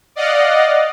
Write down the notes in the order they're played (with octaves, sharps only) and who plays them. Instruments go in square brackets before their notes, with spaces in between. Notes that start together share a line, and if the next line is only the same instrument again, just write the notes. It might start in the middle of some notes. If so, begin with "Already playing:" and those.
[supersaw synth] D5 D#5 F5 F#5